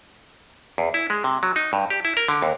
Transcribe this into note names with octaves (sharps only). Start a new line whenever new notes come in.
E2
E4
G#3
C3
F#3
D#4
G2
G4
E4
A#4
D3
D#2